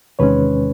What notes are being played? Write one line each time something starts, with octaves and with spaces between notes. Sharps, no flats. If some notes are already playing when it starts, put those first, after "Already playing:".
E2 C3 D#3 G#3 C#4 B4 C#5